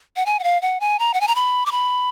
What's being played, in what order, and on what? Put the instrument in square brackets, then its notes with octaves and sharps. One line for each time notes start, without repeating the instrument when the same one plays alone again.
[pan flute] F#5
G#5
F#5
F5
F#5
G#5
A#5
F#5
G#5
A#5
B5
D6
B5